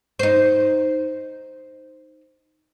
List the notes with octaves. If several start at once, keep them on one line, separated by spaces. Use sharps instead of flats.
D#4 C5